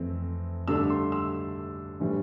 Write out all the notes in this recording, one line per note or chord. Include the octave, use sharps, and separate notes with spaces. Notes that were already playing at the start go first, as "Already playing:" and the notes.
Already playing: F2 E3 A3 C4
G2 D3 A3 D4 E6
C6
E6
A2 E3 G3 D4